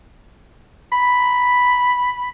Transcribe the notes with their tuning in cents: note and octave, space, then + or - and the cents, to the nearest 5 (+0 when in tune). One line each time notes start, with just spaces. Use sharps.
B5 +0